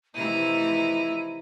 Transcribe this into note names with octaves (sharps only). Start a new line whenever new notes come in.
C3 E3 F3 A3 D#4 E4 A#5 D#7